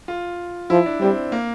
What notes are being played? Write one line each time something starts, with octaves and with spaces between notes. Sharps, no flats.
F4
F3 E4
D4
G3 C4
A#3